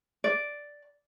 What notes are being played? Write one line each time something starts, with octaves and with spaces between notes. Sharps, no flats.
D5